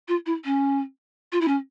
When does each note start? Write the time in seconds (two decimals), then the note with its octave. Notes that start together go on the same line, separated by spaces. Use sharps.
0.08 F4
0.26 E4
0.45 C#4
1.32 F4
1.41 E4
1.48 C#4